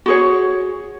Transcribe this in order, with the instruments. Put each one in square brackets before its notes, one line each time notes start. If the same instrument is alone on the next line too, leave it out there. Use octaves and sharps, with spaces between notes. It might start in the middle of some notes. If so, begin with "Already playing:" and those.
[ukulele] F#4 G#4 C#5